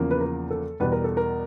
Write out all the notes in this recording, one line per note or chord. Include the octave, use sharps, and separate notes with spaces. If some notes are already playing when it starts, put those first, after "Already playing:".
Already playing: E2 C#3 F3 A#3
B4
A#4
A4
E2 B2 G3 B3 B4
A#4
A4
A#4